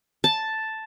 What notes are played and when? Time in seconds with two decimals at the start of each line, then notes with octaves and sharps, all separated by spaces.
0.24 A5